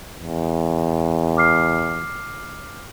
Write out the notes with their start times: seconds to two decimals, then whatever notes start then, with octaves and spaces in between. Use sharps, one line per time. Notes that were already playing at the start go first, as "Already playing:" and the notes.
0.19 E2
1.37 D6 F6 C7